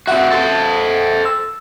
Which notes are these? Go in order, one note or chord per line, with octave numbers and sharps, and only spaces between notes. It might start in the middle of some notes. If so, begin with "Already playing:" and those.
C4 F#4 E5 F#5
A4 C5
E6